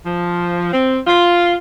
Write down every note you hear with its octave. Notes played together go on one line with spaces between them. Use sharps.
F3
C4
F4